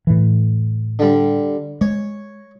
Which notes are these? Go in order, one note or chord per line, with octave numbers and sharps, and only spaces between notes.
A2 E3
D3 G3
G#3 C#5